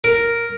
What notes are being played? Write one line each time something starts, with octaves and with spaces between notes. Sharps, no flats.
A#4